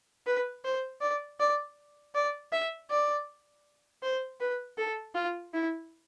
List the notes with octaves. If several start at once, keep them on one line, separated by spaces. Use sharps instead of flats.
B4
C5
D5
D5
D5
E5
D5
C5
B4
A4
F4
E4